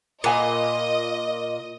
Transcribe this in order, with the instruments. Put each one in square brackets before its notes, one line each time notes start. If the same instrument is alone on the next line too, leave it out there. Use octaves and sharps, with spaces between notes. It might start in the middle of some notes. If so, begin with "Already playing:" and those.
[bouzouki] A#2 [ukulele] B4 G#5 B5 [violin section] D#5